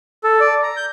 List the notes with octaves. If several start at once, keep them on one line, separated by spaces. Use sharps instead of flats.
A4
D5
A#5
G6